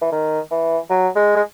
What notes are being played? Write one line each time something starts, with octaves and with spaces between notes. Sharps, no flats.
E3
D#3
E3
F#3
G#3
G#3